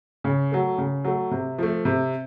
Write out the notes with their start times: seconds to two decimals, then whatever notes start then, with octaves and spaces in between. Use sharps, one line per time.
0.24 C#3
0.51 F#3 A3
0.78 C#3
1.04 F#3 A3
1.31 C3
1.58 F3 A3
1.85 C3